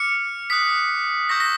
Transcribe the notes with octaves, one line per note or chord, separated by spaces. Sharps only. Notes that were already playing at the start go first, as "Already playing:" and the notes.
Already playing: D6 F6 C#7
D#6 F#6 B6
C#6 E6 G6 A#6
A#6